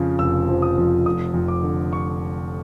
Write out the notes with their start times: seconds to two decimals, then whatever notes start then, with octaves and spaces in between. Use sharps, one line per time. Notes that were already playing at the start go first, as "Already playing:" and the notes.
Already playing: F2 C#3 F3
0.19 F1 E6
0.49 F3
0.62 D#6
0.78 F2
1.06 F1 D#6
1.34 F2
1.48 D6
1.63 D3
1.93 C#6